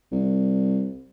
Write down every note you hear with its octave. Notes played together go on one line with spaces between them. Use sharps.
C2